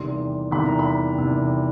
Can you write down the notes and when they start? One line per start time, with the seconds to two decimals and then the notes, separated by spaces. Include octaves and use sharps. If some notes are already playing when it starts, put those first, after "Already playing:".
Already playing: E2 C3 D#3 G3 C6
0.51 E2 C3 D#3 G3 B5
0.66 A#5
0.79 B5
1.18 E2 C3 D#3 G3